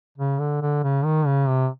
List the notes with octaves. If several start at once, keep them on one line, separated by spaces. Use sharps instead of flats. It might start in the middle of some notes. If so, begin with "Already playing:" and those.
C#3
D3
D3
C#3
D#3
C#3
C3